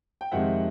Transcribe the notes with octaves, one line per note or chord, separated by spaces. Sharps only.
G5
F2 C3 D#3 G#3 C4 E5 F#5